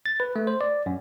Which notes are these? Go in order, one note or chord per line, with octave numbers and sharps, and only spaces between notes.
A6
B4
A3
C5
D5
F#2